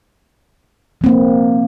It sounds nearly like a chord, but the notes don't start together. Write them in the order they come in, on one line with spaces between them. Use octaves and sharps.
F3 C4 A#3